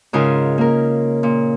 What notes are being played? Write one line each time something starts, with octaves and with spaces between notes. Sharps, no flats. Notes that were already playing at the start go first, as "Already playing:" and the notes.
G#2 C#3 F4 A#4 G#5
A#3 A#4
A#2